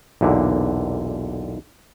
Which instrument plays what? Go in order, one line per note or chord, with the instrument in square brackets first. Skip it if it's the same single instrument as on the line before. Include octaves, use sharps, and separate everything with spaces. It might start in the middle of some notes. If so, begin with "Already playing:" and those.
[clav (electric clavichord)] B1 E2 A#2 D3